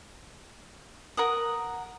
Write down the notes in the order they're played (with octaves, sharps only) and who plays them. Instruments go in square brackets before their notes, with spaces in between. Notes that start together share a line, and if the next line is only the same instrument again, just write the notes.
[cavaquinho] A#4 F#5 D#6